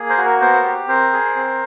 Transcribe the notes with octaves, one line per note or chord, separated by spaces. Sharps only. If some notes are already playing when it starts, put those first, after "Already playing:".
Already playing: A#3 G#4
A#4 C5
F#4
A#4
B3 A#4 C5
G4
C4 A#4 C5
G#4
C4